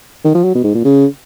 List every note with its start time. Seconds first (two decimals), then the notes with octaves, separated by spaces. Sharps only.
0.25 D#3
0.35 F3
0.44 F#3
0.55 B2
0.64 G#2
0.75 A#2
0.85 C#3